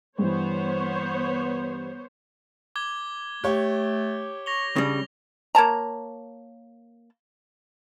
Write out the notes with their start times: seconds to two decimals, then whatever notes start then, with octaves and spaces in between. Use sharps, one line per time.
0.19 G2 E3 B3 C5 C#5
2.76 D6 G#6 G7
3.44 A3 G4 C#5
4.46 C#6 A#6 F7 G7
4.76 C#3 G3 D4
5.55 A#3 C#5 A5 A#5